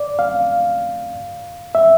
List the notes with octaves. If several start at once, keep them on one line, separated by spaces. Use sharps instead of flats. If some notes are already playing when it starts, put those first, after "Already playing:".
Already playing: D5
F5
E5